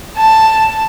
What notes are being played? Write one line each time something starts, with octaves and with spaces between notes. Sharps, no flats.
A5